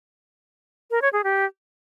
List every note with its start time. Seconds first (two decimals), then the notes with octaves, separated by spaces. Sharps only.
0.91 A#4
1.02 C#5
1.13 G#4
1.24 G4